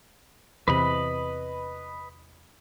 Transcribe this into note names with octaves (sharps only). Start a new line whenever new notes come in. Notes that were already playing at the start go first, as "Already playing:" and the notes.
E2 C3 B4 D#5 B5